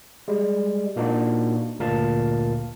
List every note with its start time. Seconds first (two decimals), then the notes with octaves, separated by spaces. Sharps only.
0.28 G3 G#3
0.96 A#2 A#3 D4 D#4 F#4
1.79 G1 D2 A#2 A#4 F5 A5